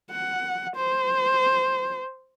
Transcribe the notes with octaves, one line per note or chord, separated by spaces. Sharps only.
F#5
C5